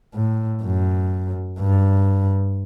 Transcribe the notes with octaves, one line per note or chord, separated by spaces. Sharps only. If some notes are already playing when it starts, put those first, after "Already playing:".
A2
F#2
G2